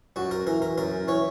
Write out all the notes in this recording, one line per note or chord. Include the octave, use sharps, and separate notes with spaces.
F#2 F#4
A#4
E3 A#4
A#4
F#2 A#4
E3 C#5